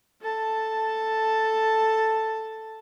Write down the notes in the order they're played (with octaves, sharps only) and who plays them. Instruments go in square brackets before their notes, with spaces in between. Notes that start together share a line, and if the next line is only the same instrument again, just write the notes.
[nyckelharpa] A4 A5